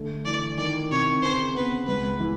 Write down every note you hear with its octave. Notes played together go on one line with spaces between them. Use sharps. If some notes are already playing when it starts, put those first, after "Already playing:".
Already playing: D3 A3
E3 D5
D#3 D5
C3 C#5
C#3 C5
B3 B4
C#2 B4
E3